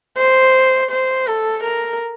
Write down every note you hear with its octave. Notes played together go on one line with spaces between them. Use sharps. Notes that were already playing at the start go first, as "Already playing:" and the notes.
C5
C5
A4
A#4